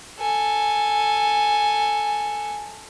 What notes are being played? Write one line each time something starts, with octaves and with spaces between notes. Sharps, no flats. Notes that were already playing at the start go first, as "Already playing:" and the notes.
A4 G#5